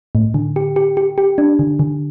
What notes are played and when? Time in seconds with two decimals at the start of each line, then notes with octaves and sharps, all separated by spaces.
0.15 A2
0.34 D3
0.56 G4
0.76 G4
0.97 G4
1.18 G4
1.38 D4
1.59 D3
1.79 D3